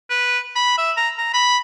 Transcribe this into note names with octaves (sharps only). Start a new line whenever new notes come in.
B4
B5
E5
A#5
A#5
B5